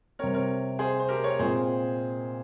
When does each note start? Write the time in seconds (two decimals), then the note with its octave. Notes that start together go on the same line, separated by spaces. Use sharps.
0.19 C3 G3 C4 A#4 C#5
0.34 A#4 C#5
0.79 G#4 C5
1.00 C5
1.09 G4 A#4
1.24 A#4 C#5
1.39 A#2 G#3 C4 F4 G#4 C5